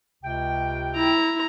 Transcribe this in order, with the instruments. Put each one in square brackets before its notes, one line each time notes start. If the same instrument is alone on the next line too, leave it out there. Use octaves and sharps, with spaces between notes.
[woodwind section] C#2 C3 G5
[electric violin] E4 [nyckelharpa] A#5